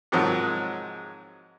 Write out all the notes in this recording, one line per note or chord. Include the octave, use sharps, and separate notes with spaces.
G#2 C3 D#3 F3 F#3 G#3